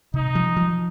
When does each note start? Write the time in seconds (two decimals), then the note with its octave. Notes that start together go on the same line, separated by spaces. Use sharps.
0.14 C3 D#4
0.35 F3
0.57 F3